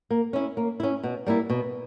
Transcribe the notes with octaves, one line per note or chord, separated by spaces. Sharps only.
A#3
C#4 E4
A#3
C#4 E4
B2
G3 A#3 E4
B2